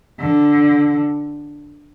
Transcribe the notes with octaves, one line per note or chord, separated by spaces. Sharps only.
D3